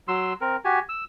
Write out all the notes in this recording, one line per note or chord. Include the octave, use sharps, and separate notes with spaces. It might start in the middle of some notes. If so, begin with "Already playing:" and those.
F#3 C6 E6
C4 A#4
F#4 G4 G#5
E6